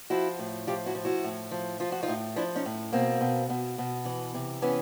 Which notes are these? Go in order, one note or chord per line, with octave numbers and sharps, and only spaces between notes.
F3 E4 F#4
A2
F3 F4 G4
E4 F#4
F3
E4 F#4
A2
F3
F3 F4
F#4
D#4 F4
A2
F3 D4 E4
C#4 D#4
A2
B2 A#3 C4
B2
B2
B2
E3
C3
E3 B3 C#4